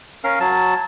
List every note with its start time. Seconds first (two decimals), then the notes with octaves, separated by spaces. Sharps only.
0.24 C#4 A#4 F5
0.40 F#3 A5